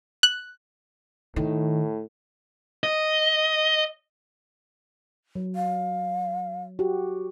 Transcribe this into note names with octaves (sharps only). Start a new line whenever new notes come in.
F#6
A2 D#3
D#5
F#3
F5
F#4 G4